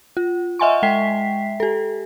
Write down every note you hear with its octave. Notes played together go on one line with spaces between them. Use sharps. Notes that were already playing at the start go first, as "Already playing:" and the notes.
F4
D#5 E5 F#5 G#5 C6 C#6
G#3 E5 G5 B6 C7
G4 A4